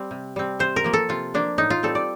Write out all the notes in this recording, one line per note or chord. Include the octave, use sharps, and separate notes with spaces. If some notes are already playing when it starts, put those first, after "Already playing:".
Already playing: G3 C4
C3
G3 C4
C3 C5
A#4
F3 A#3
A4
C3 F4
F3 A#3 D4
A2 D#4
F4
G3 C4 A4
D5